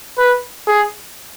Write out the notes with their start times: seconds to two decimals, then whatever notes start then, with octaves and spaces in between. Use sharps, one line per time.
0.18 B4
0.67 G#4